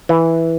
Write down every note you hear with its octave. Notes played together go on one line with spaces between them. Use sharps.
E3